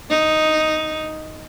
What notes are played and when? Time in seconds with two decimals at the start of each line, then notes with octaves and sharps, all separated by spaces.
0.10 D#4